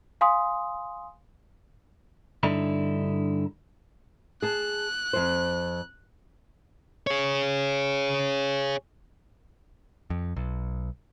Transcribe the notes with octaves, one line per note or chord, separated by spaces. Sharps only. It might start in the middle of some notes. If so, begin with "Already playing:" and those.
F5 G#5 C6 D#6
G2 D3 D#4 E4
G#4 A5 F#6
F2 C5
G#4 C#5
F2
B1